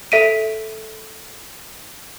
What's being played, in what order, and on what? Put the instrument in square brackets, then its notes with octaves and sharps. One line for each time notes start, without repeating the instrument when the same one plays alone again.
[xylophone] A4 E5 B6 D7 D#7